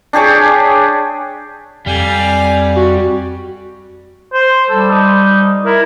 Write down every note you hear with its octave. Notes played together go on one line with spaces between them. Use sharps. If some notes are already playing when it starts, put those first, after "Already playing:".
D4 G4 G#4 C#5
F2 G3 D5 F5 G#5
F#4
C5
G3 A4
D#4
E4 A#4